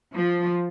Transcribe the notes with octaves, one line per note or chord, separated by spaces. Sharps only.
F3